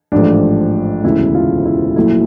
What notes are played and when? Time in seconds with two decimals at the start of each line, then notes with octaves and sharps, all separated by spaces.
0.12 A1 G#2 F3 A3 D4
1.04 E1 D2 C#3 E4
1.34 F4
1.65 E4
1.96 A#1 A#2 F#3 A3 E4